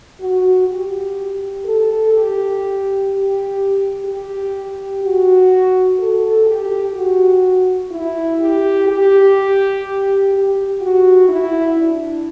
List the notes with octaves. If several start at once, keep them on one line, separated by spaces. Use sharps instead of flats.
F#4
G4
A4
G4
G4
G4
F#4
A4
G4
F#4
E4
G4
G4
G4
F#4
E4
D4